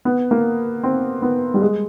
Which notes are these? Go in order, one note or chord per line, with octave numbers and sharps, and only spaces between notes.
B3
A#3
C4
B3
G3
G#3